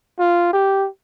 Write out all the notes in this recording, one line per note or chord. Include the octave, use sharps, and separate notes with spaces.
F4
G4